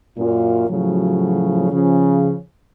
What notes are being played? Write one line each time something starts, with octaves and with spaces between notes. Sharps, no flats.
F#2 A#2 F4
A2 C#3 F3 F#3
C#3 F3